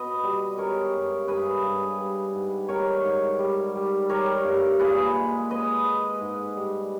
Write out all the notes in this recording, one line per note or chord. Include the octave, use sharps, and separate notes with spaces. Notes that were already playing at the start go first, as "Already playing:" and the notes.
Already playing: B2 B4 D#5
G3
G#3 A#4 C#5
G2
G2 G#4 B4
G2
G3
G#2
G3 A#4 C#5
G#2
G3
G3
G3 A#4 C#5
G2
A#2 G#4 B4
G#3
G#3 B4 D#5
G#3
G#2
G3